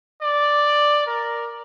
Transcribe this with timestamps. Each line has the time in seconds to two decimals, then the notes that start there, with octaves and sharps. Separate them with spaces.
0.21 D5
1.06 A#4